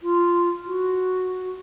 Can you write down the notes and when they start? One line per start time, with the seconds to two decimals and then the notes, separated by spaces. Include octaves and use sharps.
0.03 F4
0.67 F#4